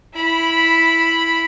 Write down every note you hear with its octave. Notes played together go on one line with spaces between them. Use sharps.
E4 B5